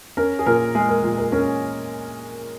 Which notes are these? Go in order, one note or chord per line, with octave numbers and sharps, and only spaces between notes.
C#4 A#4
G#4
A#2 A#4
G#3 G#4
A#4
A#2
A#4
C#4 A#4